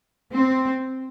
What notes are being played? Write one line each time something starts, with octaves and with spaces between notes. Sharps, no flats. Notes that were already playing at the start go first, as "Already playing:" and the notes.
C4